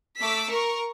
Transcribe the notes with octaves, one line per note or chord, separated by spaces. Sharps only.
A3 D6 E6 B6
A#4 C#6